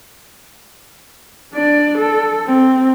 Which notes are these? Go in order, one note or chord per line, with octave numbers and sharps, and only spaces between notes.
D4 D5
A4
C4